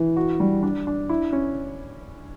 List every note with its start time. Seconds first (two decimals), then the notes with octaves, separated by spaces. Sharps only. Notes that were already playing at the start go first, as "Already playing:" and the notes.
Already playing: E3
0.17 F#4
0.40 G3
0.63 D4
0.87 D4
1.09 E4
1.33 C#4